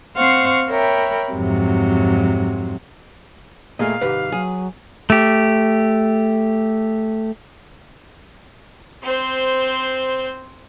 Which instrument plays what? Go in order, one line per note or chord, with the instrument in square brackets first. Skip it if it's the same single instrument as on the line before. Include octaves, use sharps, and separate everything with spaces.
[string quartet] C4 C5 F5 F#5 C#6
A#4 C#5 E5 G5 B5
F2 G#2 C3 F#3
[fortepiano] A#2 G#4 [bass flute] A3 [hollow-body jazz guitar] D#5 [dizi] F5
[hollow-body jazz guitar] C2 G#2 D#3 [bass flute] G4 [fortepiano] B4
[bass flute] F#3 [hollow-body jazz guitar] G#4
[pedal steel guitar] A3 G4
[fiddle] C4 C5